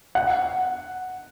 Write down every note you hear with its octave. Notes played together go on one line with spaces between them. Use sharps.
F#5